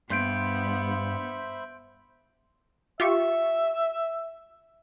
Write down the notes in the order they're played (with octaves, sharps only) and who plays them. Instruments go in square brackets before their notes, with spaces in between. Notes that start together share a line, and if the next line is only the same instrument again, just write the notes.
[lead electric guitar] G2 [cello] B3 [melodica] C5 E5 B5 [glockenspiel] C6 G6 D7
[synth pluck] F4 G4 C#6 [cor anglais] E5